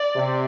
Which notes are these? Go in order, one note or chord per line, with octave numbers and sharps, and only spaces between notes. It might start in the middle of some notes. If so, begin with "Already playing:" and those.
Already playing: D5
C3